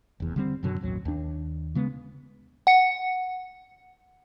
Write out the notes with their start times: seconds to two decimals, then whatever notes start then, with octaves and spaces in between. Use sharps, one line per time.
0.20 F1 E2
0.36 D3 G3 C4
0.63 F#2 B2 D3 F#3
0.81 A1 D#2 F#3
1.05 D#2 D4
1.75 C#3 G#3 B3
2.67 F#5 C#7